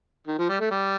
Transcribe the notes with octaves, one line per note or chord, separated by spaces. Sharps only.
D#3
F3
G3
A3
G3